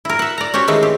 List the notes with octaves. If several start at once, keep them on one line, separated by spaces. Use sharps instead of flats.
E4 A#4
E5 F#5
D5 A#5
C#4 F#4 G4 C5 C#5
D#3 E3 G#3 A3 G#4
C4 G4